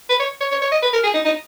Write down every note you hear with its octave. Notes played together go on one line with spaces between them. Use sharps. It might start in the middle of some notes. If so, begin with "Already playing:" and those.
B4
C#5
C#5
C#5
C#5
D#5
B4
A#4
G#4
D#4
D#4